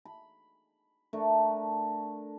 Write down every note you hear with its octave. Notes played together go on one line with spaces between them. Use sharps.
B5
A3 D4 A4 A#4